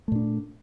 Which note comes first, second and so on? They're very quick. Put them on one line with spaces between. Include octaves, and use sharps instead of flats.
A3 A#2 D4